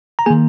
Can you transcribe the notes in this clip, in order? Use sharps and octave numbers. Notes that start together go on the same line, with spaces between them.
A#5
D#3 A#3 G#4 G#5